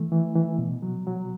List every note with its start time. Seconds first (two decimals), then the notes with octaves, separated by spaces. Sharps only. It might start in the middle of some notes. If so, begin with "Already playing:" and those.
Already playing: E3 A3
0.12 E3
0.35 E3
0.58 B2
0.83 F#3
1.07 F#3